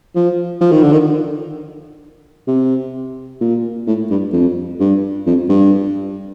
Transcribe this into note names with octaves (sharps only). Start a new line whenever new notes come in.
F3
F3
D#3
D3
D#3
C3
A#2
A2
G2
F2
G2
F2
G2